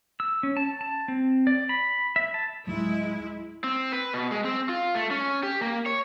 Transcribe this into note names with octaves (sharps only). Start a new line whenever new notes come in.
E6
C#4
A5
A5
C4
D5
B5
E5
A5
D1 F#3 G#3 A3 E4
C4
B4
B2
G#3
C4
F4
A3
C#4
G4
A#3
C#5